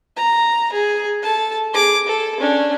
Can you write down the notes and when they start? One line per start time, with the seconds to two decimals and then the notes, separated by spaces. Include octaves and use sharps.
0.16 A#5
0.73 G#4
1.23 A4 A5
1.73 G#4 D6
2.07 A4
2.40 C#4 D4